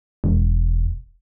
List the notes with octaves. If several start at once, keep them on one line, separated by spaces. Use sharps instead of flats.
E1